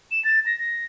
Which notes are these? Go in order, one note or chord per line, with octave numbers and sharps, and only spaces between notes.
E7
A6
A#6
A#6